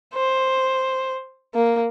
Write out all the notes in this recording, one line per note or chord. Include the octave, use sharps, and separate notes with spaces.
C5
A#3